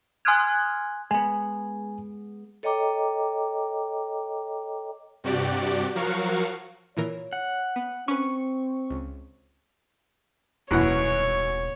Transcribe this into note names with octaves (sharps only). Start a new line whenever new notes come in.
G#5 C6 D#6 F6 F#6 G#6
G#3 B3 G#5
A4 C#5 D#5 G5 A#5 D6
G2 C3 F#4 G4 D5
F3 F#3 F#4 A#4 F5 C#6
A#2 E3 A#4 C#5
F#5
B3
C4 C#4 B4 C#6
C#2
D#1 F#2 B2 E3 C#5 F#5